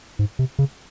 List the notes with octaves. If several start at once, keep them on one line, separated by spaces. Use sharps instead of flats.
G#2
C3
C#3